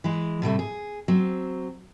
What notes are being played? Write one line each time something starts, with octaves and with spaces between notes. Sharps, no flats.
E3 G#3
A2 C3 G3 A3
G#4
F#3 C4